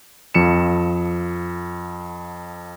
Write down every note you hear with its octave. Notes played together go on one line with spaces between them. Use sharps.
F2 F3 C#7 E7